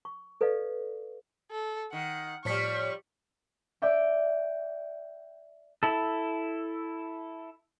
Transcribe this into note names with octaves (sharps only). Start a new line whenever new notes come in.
C#6
A4 B4 D5 D#5 F5
A4
D#3 F#5
A2 F3 G3 C#5 C#6 B6
D5 E5 G5 D6
E4 A4